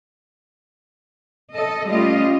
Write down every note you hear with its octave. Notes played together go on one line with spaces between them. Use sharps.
A4 D#5
G3 A3 C#4 F4 D#5